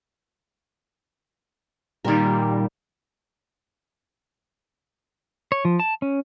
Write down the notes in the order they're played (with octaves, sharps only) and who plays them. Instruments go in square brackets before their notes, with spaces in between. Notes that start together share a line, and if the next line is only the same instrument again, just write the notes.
[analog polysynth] A#2 G3 [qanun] D#3 A#4
[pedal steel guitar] C#5
F3
A5
C#4